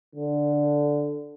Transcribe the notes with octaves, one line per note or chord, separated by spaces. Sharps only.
D3